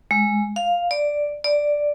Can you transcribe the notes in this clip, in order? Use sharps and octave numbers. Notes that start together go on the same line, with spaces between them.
G#3
F5
D5
D5